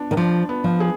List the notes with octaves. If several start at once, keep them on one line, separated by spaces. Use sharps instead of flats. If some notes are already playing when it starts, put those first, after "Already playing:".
Already playing: B3 D4
D#3
F3 D4
B3
F3
G#4